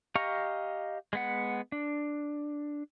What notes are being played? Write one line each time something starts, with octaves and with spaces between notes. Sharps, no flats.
G4 D#5 F5 A#5 C#6
G#3 B3 F#5
D4